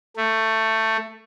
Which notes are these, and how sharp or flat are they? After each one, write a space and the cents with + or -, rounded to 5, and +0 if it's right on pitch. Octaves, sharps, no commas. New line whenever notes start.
A3 +15